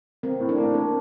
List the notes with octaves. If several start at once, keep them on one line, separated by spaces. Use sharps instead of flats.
A#3 C4
A2
D4
A#3
A#3 C4